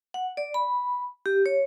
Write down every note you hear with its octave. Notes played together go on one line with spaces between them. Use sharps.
F#5
D5
B5
G4
C#5